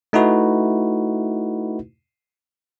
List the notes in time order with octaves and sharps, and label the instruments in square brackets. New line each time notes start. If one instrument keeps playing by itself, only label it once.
[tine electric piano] A3 D#4 E4 F#4 B4